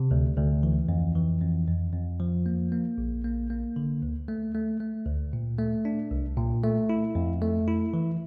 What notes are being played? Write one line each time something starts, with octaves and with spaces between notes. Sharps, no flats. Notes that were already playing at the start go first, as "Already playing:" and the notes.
Already playing: C3
D2
D2
E3
F2
E3
F2
F2
F2
F3
A#3
A#3
A#1
A#3
A#3
D3
D2
A3
A3
A3
D2
A#2
A3
D4
C2
A#2
A3
E4
F2
A3
E4
E3